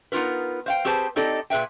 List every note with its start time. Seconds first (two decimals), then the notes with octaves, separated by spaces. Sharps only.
0.12 B3 D#4 F4 A#4 B4
0.66 C5 F5 G5
0.85 C4 G4 G#4 B4 C5 A5
1.16 C4 D#4 G4 A4 D5 D#5
1.50 A#2 G#4 B4 E5 G5